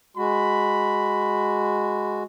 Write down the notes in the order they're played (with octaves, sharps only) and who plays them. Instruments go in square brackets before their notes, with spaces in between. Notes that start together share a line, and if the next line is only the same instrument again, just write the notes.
[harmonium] G#3 F#4 [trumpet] B5